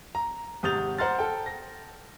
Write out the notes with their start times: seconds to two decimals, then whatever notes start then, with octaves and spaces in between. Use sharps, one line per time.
0.15 A#5
0.63 G#1 C3 D#6 G6 A6 F7
0.98 C5 F#5 A#5 C6 F6 A6
1.19 A4 G5
1.46 A#6